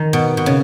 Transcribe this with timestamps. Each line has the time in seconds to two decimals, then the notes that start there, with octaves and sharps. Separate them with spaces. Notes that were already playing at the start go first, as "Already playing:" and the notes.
Already playing: D#3
0.13 B2
0.37 B2
0.46 C#3